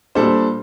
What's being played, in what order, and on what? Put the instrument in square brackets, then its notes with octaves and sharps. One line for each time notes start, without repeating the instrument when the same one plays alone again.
[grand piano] A#2 G3 D4 A4 C5